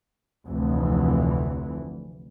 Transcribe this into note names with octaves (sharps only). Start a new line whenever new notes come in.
F1 D2 E3